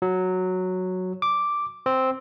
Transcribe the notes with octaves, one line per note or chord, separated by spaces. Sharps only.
F#3
D6
C4